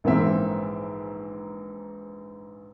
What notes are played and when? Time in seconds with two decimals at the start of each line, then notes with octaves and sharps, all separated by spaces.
0.04 A#1 G#2 E3 A#3 C4 E5